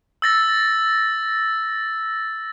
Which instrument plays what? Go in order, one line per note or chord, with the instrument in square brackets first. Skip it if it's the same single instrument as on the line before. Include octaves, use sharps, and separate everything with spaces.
[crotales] E6 A6 A#6